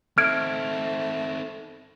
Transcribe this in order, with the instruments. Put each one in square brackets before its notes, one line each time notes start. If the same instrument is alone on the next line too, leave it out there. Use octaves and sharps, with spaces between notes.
[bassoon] A3 [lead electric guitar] C4 D#4 [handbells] F6 G#6 D7